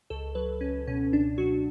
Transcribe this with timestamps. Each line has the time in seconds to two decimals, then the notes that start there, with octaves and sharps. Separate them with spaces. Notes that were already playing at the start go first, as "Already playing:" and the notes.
0.10 C#2 A4
0.35 F#3 B4
0.61 C#2 C#4
0.87 B2 C#4
1.13 C#2 D4
1.38 F#3 F#4